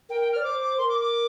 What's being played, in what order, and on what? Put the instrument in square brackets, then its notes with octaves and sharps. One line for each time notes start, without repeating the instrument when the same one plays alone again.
[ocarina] A#4 [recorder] G5
[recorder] G5
F6
[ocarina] D5
[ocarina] C5 [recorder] D6
[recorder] D6
[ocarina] A#4 [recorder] C6
[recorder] D6
D6